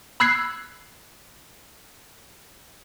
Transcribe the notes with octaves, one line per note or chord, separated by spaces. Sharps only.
B5 E6 F#6 G#6 C7